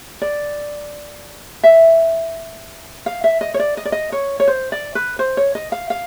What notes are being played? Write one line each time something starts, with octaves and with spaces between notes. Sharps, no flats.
D5
E5
F5
E5
D#5
C#5
D5
D#5
D5
D#5
C#5
C#5
C5
D5
B4
C5
C#5
D#5
F5
F5